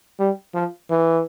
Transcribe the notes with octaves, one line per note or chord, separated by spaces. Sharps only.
G3
F3
E3